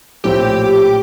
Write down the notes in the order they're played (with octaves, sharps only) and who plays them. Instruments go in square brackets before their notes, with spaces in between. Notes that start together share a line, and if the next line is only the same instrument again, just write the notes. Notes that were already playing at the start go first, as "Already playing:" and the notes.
[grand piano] A#1 A2 C4 [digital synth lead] G4